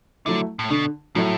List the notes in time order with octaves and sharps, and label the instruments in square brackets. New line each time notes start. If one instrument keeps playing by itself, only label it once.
[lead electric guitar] D3 [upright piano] F#3 A3 E4
[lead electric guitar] A2
[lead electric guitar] B2 [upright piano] D3
[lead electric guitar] A2 [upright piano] F#3 A3 E4